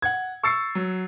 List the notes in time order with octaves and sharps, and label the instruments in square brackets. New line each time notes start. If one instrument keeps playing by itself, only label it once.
[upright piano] F#5 G#6
C#6 E6 A6 C7 C#7
F#3